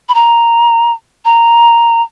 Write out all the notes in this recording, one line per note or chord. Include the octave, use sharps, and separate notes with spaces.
B5
A#5
A#5